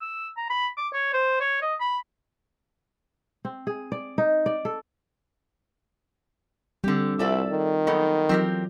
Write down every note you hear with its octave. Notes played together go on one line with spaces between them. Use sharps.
E6
A#5
B5
D6
C#5
C5
C#5
D#5
B5
C4
G#4
D5
D#4
D5
A4
D3 G3 C4 G4
C2 F4 A4 D5 E5
D#3
F#3 B3 D#4 A4 D#5
E3 F#3 C4 F4 G4 A#4